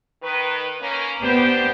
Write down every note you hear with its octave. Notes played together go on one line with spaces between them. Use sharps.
D#3 B4
A#3 C#4
B3 D4 G4 C5